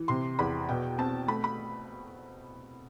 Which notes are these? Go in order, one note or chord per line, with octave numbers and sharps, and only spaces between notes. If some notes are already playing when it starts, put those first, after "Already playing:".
Already playing: E3
C3 C6
E2 B5
B2 G5
C4 A5
A3 B5
B5